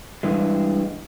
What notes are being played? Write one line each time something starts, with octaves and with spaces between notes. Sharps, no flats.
G2 E3 G#3